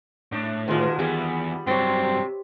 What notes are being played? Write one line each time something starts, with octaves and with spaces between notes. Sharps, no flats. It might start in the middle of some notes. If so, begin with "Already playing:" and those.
A2 D4
B2 D3 D#3 G#3 F4
E2 G3 B3 G4 G#4
G2 C3 F#3 C4 C#5 D5